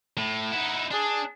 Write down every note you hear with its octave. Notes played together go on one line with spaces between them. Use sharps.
A2
D#4 E4 F#5
D4 G#4